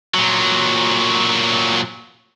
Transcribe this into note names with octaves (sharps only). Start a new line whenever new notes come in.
A#2 F#3